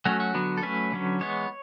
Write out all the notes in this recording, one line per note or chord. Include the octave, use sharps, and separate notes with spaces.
F#3 A3 C#4 F#4
F#4
D3 F#3 B3
A4
F#3 A3 C#4 B4
D3 F#3 C#4
E3 G#3 B3 C#5